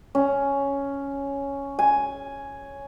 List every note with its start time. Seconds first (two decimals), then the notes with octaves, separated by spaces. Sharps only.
0.15 C#4
1.79 G#5